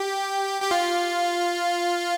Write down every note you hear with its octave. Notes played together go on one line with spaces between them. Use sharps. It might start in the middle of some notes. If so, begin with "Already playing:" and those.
Already playing: G4
G4
F4